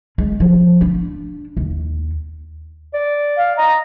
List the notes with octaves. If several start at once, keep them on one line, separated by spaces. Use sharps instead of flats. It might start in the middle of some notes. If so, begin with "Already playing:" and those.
G#3
F3
D4
D#2
D5
F5
D#5 A#5